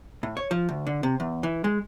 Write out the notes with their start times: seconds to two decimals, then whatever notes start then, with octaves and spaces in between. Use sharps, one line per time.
0.23 A2
0.37 C#5
0.51 F3
0.69 D2
0.87 D3
1.03 C3
1.20 E2
1.43 E3
1.64 G#3